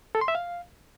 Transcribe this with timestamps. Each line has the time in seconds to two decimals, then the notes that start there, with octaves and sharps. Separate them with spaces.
0.15 A4
0.21 C6
0.28 E5
0.35 F5